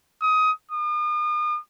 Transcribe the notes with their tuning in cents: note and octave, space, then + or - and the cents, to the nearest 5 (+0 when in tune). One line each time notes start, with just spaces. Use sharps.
D#6 +20
D#6 -40